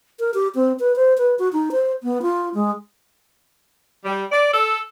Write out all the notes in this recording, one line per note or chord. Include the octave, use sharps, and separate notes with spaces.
A#4
G4
C4
B4
C5
B4
F#4
D#4
C5
B3
F4
G#3
G3
D5
A4